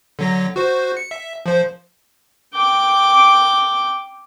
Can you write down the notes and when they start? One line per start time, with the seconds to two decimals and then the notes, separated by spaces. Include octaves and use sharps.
0.19 D3 F#3 A#6
0.56 F#4 C5
0.97 C#7
1.11 E5
1.46 F3 C5
2.54 G5 D6